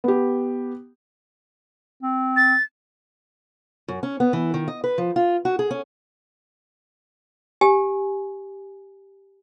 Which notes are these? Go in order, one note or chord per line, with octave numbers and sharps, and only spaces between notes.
B3 G4
C4
A6
F#2
C#4
B3
E3
D#3
D#5
B4
F3
F4
F#4
G#4
C#4
G4 G#5